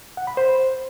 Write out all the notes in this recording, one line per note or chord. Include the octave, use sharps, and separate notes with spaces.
F#5
B5
C5